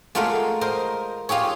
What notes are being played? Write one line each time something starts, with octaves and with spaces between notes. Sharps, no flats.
G#3 A3 F4 A#4 D5 F#5
A#4 C5 D#5
F4 G4 G#4 C#5